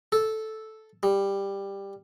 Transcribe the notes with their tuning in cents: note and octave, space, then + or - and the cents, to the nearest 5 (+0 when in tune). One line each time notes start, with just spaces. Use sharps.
A4 -5
G3 +10